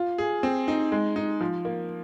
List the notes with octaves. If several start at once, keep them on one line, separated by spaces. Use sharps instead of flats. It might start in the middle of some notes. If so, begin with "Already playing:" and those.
Already playing: F4
G#4
C4
D#4
G#3
D#4
F3
A#3